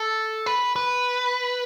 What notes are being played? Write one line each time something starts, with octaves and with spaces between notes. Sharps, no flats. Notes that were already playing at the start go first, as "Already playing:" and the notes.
Already playing: A4
B4
B4